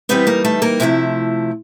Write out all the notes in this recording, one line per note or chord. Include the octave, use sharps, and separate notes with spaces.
E3 G3 B3 C4 D#4 B4
A#3 A#4
A3 A4
A#3 A#4
C3 F3 A3 E4